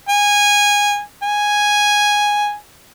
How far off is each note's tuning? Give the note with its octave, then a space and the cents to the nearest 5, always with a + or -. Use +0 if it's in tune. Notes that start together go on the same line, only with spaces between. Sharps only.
G#5 -15
G#5 -5